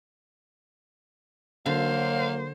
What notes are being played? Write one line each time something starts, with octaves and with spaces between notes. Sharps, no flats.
D3 F#3 A#3 C5 F5